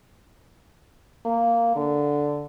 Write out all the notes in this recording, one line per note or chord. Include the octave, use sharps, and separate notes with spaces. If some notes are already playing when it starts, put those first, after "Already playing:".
A#3
D3